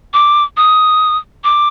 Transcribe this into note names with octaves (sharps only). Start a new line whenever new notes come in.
D6
D#6
D6